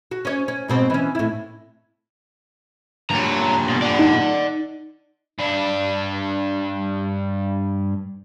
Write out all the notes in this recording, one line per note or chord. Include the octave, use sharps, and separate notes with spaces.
F#4
C#4 C#5
C#4
G#2 B2 C4
E3 C#4
A2 E4
G2 A#2 C#5 A#5
B2
D5 F#5
D#4
G2 D4